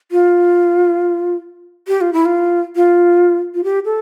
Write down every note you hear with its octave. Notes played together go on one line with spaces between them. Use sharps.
F4
G4
F4
E4
F4
F4
F4
G4
A4